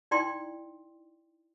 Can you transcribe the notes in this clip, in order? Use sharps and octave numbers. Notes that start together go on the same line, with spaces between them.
D#4 E4 D5 G5 C6